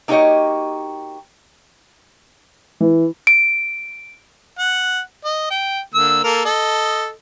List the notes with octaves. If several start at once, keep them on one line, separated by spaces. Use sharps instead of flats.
A#3 D#4 F#4 G4 C#5 D#5
E3
D7
F#5
D#5
G5
D3 A#3 E6
A#3 A4 A#4
A4 D#5